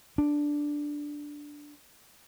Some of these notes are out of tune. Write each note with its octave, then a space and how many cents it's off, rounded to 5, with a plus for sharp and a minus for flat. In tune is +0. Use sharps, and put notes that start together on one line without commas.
D4 +0